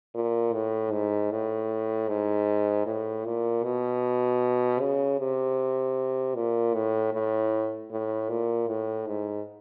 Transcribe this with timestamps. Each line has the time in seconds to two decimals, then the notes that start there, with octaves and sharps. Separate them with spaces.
0.15 A#2
0.53 A2
0.92 G#2
1.31 A2
2.08 G#2
2.86 A2
3.25 A#2
3.63 B2
4.80 C#3
5.19 C3
6.35 A#2
6.74 A2
7.13 A2
7.91 A2
8.29 A#2
8.68 A2
9.07 G#2